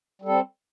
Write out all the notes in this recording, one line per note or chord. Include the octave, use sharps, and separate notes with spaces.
G3 C4 A4